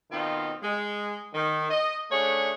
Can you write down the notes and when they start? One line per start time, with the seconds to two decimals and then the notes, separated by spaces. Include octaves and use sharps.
0.11 B2 D#3 C4 D#4 F4
0.62 G#3
1.33 D#3
1.70 D#5
2.10 C#3 A3 D4 G#4 C#5 F#5